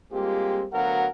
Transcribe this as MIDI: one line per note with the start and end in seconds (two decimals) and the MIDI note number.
0.13 0.65 55
0.13 0.65 56
0.13 0.65 58
0.13 0.65 60
0.13 0.65 65
0.13 0.65 67
0.73 1.08 38
0.73 1.08 54
0.73 1.08 59
0.73 1.08 70
0.73 1.08 77
0.73 1.08 78